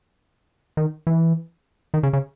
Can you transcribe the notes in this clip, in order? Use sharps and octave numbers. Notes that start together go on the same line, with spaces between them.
D#3
E3
D#3
C#3
C#3